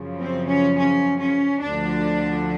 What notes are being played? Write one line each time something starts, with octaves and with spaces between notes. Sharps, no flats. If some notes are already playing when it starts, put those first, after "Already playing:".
Already playing: F#2 C#3 F3
C4
C#4
C#4
C#4
D2 D3 F3 D4